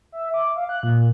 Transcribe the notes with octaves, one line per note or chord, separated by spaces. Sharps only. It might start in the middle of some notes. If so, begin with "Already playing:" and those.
E5
D6
F5
F#6
A#2